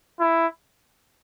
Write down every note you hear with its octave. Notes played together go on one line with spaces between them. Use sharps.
E4